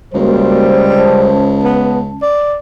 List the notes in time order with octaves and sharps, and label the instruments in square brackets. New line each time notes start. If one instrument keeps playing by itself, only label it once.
[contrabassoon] C#2 [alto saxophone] G3 [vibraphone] A#3 F#4 A#4 [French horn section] C5
[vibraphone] C#4 A5
[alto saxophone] B3
D5